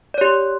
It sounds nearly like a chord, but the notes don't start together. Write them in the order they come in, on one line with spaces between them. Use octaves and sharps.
D5 C#5 G4